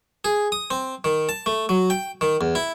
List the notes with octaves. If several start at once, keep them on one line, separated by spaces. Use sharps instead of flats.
G#4
D#6
C4
D#3
A5
A3
F#3
G5
D#3
E2
E4